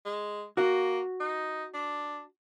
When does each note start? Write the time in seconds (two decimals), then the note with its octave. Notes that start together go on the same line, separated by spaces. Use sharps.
0.05 G#3
0.57 A#3 F#4
1.20 D#4
1.74 D4